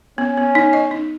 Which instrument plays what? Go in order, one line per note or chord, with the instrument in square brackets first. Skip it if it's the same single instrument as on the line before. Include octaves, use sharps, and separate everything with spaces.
[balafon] B3 [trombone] C#4
[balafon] B3
D#4
D#5
D#4